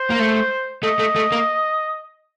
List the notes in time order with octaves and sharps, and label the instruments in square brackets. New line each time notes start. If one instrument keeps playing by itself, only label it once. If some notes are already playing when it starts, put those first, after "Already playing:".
Already playing: [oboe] C5
[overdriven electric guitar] A#3
A3
[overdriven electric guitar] A3 [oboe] D#5
[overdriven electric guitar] A3
A3
A#3